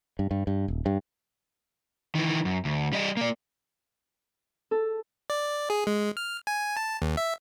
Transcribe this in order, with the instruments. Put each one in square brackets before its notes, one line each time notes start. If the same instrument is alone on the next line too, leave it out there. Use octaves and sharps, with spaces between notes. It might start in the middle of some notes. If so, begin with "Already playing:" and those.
[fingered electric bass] G2
G2
G2
D#1
G2
[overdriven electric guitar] D#3 E3
F#2
D2
G3 D#5
A#3 D5
[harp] A4
[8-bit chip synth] D5
G#4
G#3
F6
G#5
A5
D#2
E5